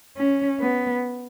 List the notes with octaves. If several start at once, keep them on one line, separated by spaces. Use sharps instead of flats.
C#4
B3